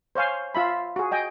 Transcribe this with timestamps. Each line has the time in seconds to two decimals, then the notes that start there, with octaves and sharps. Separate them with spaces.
0.15 C5 C#5 F5 G#5
0.55 F4 E5 B5
0.96 F#4 G#4
1.12 D#5 G5 G#5